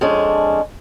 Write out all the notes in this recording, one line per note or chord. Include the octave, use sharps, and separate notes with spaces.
F2 G#3 C#4 D4